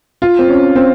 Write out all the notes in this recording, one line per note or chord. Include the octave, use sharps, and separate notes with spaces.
F4
C4
C#4
C4